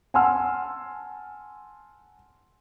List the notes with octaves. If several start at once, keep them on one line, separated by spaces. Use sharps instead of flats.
F#5 G#5 A5 C6 E6 F6